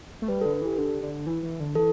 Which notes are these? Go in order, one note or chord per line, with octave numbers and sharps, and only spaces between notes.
A3
G3 B4
A4
D3
A4
E3 G4
D3
D3
E3
E3
D3
E3 A4